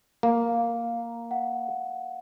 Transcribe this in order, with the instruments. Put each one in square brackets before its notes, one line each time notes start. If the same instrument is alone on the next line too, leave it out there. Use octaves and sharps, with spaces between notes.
[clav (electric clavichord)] A#3 [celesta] F5 A#5
[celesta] F5 F#5